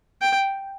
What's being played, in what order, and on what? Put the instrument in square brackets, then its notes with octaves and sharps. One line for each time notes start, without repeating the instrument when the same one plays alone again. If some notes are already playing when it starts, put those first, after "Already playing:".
[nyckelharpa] G5